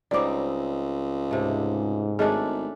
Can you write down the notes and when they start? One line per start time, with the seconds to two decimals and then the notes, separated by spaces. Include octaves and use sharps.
0.11 C#2 G3 C4 D#4 D5 D6
1.31 G#2 C3 A3
2.19 G#1 A3 C#4 D4 G#4 D#5